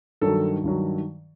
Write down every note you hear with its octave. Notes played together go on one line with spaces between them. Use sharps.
G2 D#3 F#3 A4
G2 D#3 F#3